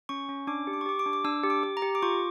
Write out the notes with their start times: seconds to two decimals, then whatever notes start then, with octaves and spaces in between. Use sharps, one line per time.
0.09 C#4 C#6
0.29 C#4
0.47 D4 D6
0.67 G4
0.73 D6
0.81 C#6
0.86 G4 D6
0.99 D6
1.06 D4
1.13 D6
1.25 D4 E6
1.43 G4
1.50 D6
1.63 G4
1.77 A#5
1.82 G4
1.95 D6
2.02 F4 C#6